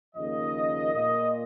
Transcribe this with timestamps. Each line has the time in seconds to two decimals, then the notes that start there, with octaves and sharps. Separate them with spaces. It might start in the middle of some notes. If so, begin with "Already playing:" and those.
0.15 D#2 C#3 F3 A#3 D#5
0.93 A#2 A#3 D#5